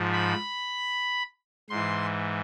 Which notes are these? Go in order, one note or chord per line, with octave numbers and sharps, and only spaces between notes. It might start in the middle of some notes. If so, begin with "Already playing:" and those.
Already playing: G#2 F3
B5
G#2 E3 C6